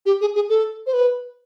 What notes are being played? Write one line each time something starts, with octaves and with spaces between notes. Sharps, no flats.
G4
G#4
G#4
A4
C5
B4